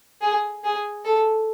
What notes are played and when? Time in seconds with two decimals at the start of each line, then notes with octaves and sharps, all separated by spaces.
0.21 G#4
0.64 G#4
1.05 A4